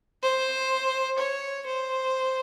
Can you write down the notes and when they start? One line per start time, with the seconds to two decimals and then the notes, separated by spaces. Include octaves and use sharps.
0.23 C5
1.19 C#5
1.66 C5